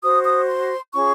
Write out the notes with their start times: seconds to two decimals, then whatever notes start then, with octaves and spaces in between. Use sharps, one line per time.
0.02 F#4 C5 D#6
0.24 D#6
0.47 C6
0.93 C#4 F4 G#4 C#5 C#6